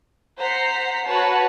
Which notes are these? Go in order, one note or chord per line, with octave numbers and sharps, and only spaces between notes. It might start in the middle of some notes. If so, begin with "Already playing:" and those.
C5 F#5 A#5 B6 C7
F#4 B4 C#5 A5